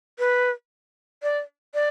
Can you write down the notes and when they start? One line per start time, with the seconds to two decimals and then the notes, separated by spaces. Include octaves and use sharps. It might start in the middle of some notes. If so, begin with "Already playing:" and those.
0.19 B4
1.23 D5
1.74 D5